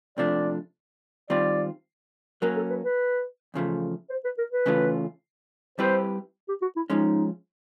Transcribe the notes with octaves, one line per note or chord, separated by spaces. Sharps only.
C3 F3 A3 D4 D5
D#3 G3 C4 F4 D5
F#3 A#3 C#4 A#4
A4
B4
B4
E2 C#3 F3 A3
C5
B4
A#4
B4
C#3 E3 A3 C#4 F4
G3 C4 E4 G4 B4 C5
G4
F#4
E4
F3 G#3 C#4 D#4